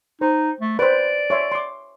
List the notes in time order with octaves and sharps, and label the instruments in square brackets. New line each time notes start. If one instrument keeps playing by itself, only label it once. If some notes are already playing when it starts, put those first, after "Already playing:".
[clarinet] D#4 [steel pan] C5
[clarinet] A3
[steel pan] B4 C5 [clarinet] D5
[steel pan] C#5 E5 C6
C6 D6